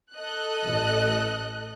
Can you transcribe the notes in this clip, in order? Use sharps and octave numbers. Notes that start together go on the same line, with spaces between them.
A4 D#5 F#6
A1